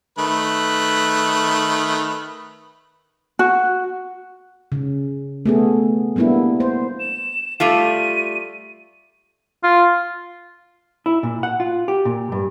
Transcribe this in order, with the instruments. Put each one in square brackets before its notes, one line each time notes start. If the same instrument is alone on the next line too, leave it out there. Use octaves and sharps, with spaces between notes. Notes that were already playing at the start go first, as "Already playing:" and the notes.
[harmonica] D#3 A3 B4
[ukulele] F#4
[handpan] C#3
A3 B3 G#4
G3 A#3 B3 D4 E4
C5
[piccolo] E7
[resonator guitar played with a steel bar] G3 A3 F4 [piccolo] D#7
[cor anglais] F4
[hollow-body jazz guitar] E4
A#2
F#5
F4
G4
A#2
G2